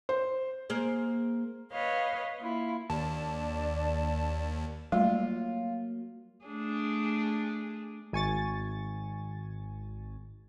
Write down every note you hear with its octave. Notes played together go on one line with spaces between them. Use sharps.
C5
A#3 G#4 C5
B4 C#5 D#5 F5
A#3 E4 F4
D#2 D4 D5 A5
F#3 G3 A3 A#3 F4
A3 D4 G#4
G#1 G#5 C#6 A6